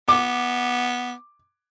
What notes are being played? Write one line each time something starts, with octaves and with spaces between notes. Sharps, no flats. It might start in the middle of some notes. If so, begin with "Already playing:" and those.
B3 D6